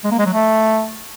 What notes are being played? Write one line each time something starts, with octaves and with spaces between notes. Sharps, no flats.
G#3
A#3
G#3
F#3
A3